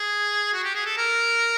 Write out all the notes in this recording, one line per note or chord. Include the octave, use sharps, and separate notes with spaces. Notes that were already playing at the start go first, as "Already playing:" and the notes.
Already playing: G#4
F#4
G4
G#4
A4
A#4